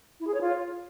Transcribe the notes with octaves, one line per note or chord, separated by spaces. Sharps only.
E4
G#4
C#5
F4